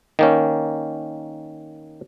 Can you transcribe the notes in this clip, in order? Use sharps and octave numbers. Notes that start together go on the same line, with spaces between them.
D#3 A#3 C#4